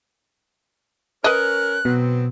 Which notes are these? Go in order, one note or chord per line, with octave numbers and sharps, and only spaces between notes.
C#4 A#4 B4 C#5 D#5 F#6
B2 F#3 B3 C4